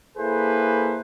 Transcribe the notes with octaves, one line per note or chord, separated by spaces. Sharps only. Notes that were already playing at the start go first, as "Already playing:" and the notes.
A#3 E4 G#4 A4 B4 C5